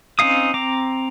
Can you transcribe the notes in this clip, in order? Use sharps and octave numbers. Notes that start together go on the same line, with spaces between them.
C4 C#4 D#4 F5 D#6
C4 A#5 D6